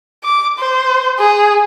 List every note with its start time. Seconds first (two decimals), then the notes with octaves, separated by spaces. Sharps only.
0.23 D6
0.58 C5
1.19 G#4